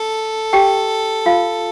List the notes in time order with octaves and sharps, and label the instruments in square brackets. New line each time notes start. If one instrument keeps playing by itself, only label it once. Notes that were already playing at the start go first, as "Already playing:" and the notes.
Already playing: [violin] A4
[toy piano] G4 G5
F4 F5